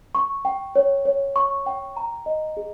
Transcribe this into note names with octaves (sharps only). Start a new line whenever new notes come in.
C#6
G5
C#5
C#5
C#6
G5
A#5
D#5
G#4